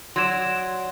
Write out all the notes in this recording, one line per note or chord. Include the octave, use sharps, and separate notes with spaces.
F#3 D5 C6 G#6 E7